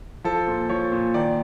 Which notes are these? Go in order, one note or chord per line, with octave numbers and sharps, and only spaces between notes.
F3 A4
A#2
F3 C#5
A#2
D#3 D5